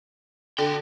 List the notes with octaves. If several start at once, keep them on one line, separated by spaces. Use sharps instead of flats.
D3 F#4 G5